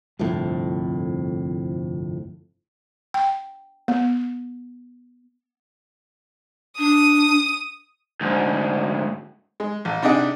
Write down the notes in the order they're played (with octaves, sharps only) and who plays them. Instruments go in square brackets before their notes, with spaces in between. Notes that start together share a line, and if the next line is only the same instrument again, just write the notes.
[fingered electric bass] G1 C2 F2 A2
[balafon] G5
B3
[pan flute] D4 [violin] D#6
[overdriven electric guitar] D2 G#2
[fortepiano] G#3
A1
C3 D4 D#4 G#4 F#5